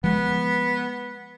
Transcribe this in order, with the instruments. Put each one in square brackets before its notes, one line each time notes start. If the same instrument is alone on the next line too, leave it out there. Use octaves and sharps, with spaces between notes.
[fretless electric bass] F3 G#3 [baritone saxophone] B3